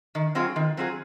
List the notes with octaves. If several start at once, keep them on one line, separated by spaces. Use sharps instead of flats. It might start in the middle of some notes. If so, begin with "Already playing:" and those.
D#3
F#3 C4 F4 G#4
D#3
F#3 C4 F4 G#4